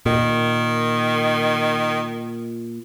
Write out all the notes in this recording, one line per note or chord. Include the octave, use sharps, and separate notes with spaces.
A#2 D#3